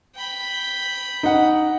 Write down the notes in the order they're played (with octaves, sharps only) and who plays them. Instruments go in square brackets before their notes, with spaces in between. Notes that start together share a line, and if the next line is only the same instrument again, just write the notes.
[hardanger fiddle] G5 B5
[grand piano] D#4 F#5